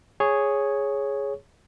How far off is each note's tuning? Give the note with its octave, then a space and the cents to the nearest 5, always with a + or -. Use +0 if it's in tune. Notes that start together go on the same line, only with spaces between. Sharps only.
G#4 +0 C#5 +0 C#6 +0